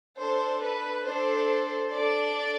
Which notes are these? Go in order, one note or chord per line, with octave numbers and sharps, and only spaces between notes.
D4 A4 C5
B4
D4 A4 C5
D4 A4 D5